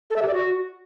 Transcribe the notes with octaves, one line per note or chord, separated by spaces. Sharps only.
A4
E5
G4
D5
F#4